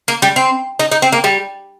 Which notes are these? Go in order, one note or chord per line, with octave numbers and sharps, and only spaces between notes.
A#3
G3
C4
D#4
D#4
C4
A#3
G3